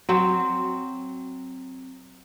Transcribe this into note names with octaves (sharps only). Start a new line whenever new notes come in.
F#3 C4